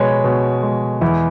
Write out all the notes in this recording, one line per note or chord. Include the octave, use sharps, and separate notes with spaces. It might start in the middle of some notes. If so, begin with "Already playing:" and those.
Already playing: B2 G#3 B4 C#5
B2
G#3
E2 E4